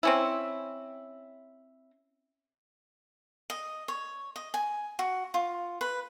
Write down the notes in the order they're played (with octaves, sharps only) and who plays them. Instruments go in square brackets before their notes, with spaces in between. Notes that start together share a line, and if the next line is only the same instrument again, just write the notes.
[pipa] C4 C#4 E4
[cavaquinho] D#5
C#5
D#5
G#5
F#4
F4
B4